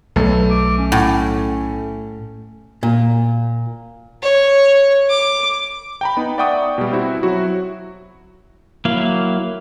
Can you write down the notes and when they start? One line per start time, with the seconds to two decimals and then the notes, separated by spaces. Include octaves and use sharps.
0.16 B1 A3
0.51 D6
0.78 C#4
0.92 A2
2.83 A#2
4.22 C#5
5.09 D6
6.01 G5 A#5 B5
6.17 B3 D#4
6.38 D5 E5 F#5 G5 C#6 D#6
6.78 B2 G3
6.92 C4 E4 F#4
7.23 F#3 E4 F#4
8.85 F#3 A#3 E4 F5